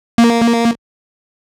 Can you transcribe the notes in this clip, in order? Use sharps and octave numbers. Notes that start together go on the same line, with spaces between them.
A#3